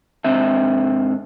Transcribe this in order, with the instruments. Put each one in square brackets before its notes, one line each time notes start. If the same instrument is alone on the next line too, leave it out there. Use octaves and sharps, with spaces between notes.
[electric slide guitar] G#2 C4 D4 E5